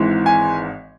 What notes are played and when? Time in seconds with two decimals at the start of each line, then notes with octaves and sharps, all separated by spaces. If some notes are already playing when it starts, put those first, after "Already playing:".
Already playing: G#1 G#2 E3
0.26 G#5